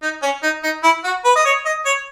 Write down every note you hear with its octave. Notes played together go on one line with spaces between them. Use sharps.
D#4
C#4
D#4
D#4
E4
F#4
B4
D#5
C#5
D#5
C#5